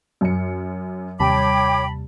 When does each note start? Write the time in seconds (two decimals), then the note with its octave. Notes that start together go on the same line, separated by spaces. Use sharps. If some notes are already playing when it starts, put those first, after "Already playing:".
0.21 F#2 C#7
1.20 D#2 C3 G3 C#5 G5 A5 B5 D6